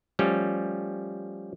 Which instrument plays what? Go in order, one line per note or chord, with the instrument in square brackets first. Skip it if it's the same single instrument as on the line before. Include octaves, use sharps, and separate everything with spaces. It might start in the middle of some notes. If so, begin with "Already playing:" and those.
[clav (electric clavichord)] F3 G3 A3 C#4